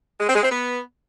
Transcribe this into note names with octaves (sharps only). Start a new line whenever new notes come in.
G#3
C4
G#3
C4
B3